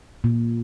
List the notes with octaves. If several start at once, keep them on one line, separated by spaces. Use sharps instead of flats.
A#2